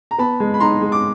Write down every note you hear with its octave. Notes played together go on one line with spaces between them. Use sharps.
A#5
B3 A5 B5
G#3
B5
D#4 A#5 C6
G#3
D6